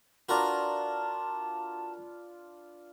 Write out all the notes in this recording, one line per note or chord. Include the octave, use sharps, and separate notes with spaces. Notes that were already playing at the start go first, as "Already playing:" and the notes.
D4 F4 F#4 A#4 B4 A5 A#5